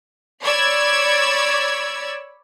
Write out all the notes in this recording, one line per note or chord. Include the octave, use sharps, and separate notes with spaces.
C#5 D5 B5 E6 G#6